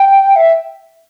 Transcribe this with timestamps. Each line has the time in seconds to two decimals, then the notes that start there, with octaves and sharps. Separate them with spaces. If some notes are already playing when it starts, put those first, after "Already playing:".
Already playing: G5
0.36 E5